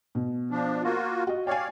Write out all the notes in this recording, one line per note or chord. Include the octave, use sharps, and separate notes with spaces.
B2
F3 D4
A#3 F4 F#4
F#4 D#5
C#5 D5 F5 G5 G#5